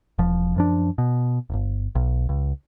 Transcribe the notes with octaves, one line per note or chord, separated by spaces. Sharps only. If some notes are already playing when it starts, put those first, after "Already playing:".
E1 F3
F#2 F3 D4
B2
D1 G1
B1
C#2